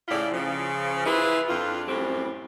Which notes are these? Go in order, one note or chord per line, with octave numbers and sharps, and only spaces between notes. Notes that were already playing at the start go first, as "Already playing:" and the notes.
A2 C#3 E4 F4 D5
C#3 F3
E4 F4 G#4 B4
F2 D4 F4
F#2 A2 G3 C4